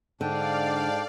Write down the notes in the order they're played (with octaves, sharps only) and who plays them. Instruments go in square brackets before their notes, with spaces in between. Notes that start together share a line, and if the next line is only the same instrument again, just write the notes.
[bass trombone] G#2 [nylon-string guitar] D3 [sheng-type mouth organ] D4 G5 [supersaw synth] D5 F5